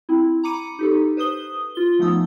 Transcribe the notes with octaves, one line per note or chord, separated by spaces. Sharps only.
C4 E4
A#5 B5 D6 C#7 D#7
D#4 G4 A4
B4 C5 D#6 G7
F4 G7
F3 A3 B3 D#4 D#6 E6